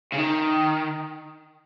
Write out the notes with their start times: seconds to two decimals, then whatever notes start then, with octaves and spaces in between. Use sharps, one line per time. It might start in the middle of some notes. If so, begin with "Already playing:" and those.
0.13 C#3
0.18 D#3